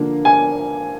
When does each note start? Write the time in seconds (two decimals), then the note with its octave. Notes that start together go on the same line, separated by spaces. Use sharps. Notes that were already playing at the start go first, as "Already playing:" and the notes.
Already playing: D3 F3 A#3
0.25 G#5